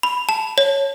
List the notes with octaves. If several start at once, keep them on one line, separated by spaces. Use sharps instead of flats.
B5
A5
C#5